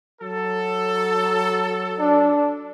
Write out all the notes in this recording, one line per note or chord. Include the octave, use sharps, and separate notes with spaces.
F#3 A4
D4